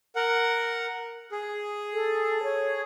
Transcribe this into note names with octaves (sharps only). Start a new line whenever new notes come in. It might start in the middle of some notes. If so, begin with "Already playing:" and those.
A#4 F#5
G#4
A4
C#5